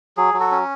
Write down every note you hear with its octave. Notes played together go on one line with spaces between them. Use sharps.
F#3 G#4
F#3
F#4 A4
C#4